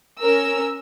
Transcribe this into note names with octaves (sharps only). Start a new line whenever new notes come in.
C#4 A#4 E6